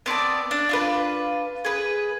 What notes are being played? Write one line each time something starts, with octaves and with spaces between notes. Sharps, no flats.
B3 C4 D5 A5
D4
D4 F4 B4
G#4 B4